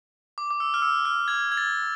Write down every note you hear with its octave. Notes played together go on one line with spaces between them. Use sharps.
D6
D6
E6
F6
E6
F6
G#6
G#6
A6